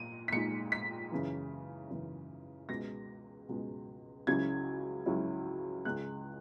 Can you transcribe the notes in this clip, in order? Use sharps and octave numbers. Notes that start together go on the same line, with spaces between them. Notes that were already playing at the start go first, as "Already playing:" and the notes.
Already playing: A#2 D#7
B6
A#2 G#3 D#4 C#7
B6
F#2 C#3 E3
F#2 C#3 E3
C#2 B2 G#3 A#6
C#2 B2 G#3
C#2 C#3 F#3 C#4 E4 G#6
C#2 C#3 F#3 C#4 E4
C#2 C#3 G#3 F#6